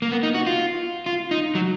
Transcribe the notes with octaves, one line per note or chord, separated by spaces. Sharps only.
A#3
B3
D#4
F#4
F4
F4
D#4
F#3